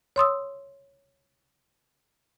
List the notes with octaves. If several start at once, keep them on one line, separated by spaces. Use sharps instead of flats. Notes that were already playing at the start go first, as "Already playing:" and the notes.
C#5 C6 D#6 E6